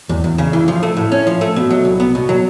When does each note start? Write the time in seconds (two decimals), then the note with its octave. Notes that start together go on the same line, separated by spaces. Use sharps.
0.09 E2
0.24 E2
0.38 C#3
0.53 E3
0.68 F3
0.83 A3
0.97 A2
1.12 C#4
1.27 F3
1.41 A3
1.56 B2
1.71 F#3
1.85 C2
2.00 B3
2.15 B2
2.29 F#3